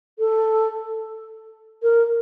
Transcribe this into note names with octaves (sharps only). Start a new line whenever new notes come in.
A4
A#4